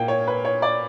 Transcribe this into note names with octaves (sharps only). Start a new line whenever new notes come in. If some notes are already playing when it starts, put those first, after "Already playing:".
Already playing: A#2 A#3 G5
C#5
B4
C#5
D5